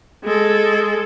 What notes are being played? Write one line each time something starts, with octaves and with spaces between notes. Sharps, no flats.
G#3 A4